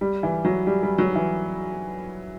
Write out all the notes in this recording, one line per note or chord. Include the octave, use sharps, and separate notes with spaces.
G3
E3
F#3
G3
G3
F#3
E3